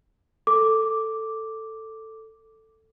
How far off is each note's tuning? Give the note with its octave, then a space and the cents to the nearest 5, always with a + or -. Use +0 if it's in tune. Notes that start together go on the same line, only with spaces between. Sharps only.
A4 +10 D6 +0